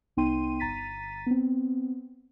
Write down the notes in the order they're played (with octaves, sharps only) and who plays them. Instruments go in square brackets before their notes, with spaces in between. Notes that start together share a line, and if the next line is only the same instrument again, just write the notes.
[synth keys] C2 B3 D#4 G5 C6 D#7
G1 A#5 A6 B6 D#7
B3 C4